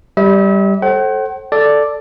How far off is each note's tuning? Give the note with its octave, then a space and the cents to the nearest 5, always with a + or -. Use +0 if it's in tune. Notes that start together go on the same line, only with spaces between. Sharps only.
G3 +0 E5 -40
A4 -5 C5 +40 F#5 +45
A4 +0 D5 +0